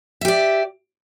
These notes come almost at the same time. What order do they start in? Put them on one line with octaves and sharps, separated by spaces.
E5 G4 D5